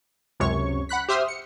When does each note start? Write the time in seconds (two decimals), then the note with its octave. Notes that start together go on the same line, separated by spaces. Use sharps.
0.40 C#2 F#2 C3 C#5 C#6
0.89 F#5 B5 F#6 B6
1.09 G4 C5 E5 C6 D#6 F6
1.28 C#7